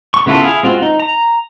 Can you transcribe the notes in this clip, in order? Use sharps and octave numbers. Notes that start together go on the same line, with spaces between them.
C#6
C#3 B3 E4 F4 A4
E4 G#4 F5
G#3 C4 F4 F#4
D#4
A#5